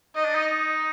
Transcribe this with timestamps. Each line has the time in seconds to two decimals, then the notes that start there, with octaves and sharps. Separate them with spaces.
0.16 D#4 D#5
0.25 D4
0.35 D#4